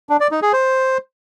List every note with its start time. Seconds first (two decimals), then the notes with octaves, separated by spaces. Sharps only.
0.09 D4
0.20 D5
0.31 D#4
0.42 G#4
0.53 C5